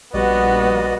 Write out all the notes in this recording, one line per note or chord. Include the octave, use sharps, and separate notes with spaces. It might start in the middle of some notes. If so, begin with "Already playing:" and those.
A#1 G3 B3 F#4 D5 D#5